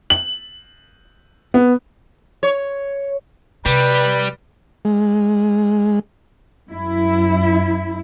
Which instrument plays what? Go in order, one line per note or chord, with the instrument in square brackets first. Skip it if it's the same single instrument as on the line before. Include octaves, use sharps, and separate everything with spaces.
[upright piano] F#7
B3
[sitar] C#5
[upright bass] C3 [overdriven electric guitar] G3 [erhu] B4
[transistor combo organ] G#3
[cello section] F#2 E4